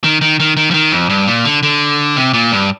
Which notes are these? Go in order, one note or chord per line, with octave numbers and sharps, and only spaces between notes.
D#3
D#3
D#3
D#3
F3
D#3
F2
G2
A#2
D3
D3
C3
A#2
G2